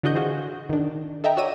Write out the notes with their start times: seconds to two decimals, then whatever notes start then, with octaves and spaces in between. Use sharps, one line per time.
0.03 D3 E3 F#4 D#5 G6
0.15 F4 F#4 G#4 C5
0.69 D#3 D4
1.24 A4 D#5 E5 G5 A#5
1.37 F#4 C#5 D5 E6 A#6 D#7